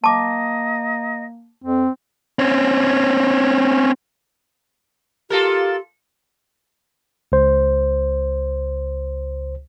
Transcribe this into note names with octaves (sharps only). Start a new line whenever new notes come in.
A#3 D#5 A5 D6
F2 C4
C4 C#4
F4 G4 A4 A#4
C#2 C5